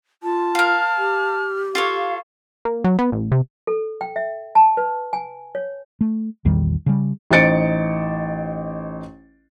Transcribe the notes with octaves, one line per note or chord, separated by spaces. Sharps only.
F4 A5
A#4 F5 F6
G4
F4 A4 C#5 F5
A#3
F#3
B3
A1
C3
A4
G5
E5
A5
B4
G#5
C#5
A3
A#1 E2 D#3 G3
C#3 G3
A1 D#4 C5 A6 C#7 D7